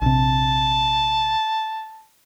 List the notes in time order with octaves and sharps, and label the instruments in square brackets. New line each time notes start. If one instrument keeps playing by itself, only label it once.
[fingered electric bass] A#1 C3 [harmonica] A5